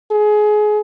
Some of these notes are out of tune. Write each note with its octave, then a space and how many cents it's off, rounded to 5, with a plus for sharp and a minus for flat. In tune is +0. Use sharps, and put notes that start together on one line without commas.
G#4 +25